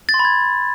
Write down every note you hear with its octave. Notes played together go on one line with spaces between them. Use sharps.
A6
C6
B5
G#6